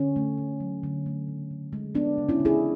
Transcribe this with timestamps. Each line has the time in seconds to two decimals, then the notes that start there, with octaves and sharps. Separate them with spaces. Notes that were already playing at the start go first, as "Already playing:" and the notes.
Already playing: D3 C#4
0.16 A3
0.38 D3
0.60 F#3
0.83 D3
1.06 A3
1.28 C#3
1.51 C#3
1.73 G#3
1.95 G#3 B3 D4
2.18 C#3
2.29 C#4 E4
2.40 C#3
2.45 E4 G#4